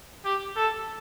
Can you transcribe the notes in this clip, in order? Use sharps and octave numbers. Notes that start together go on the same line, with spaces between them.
G4
A4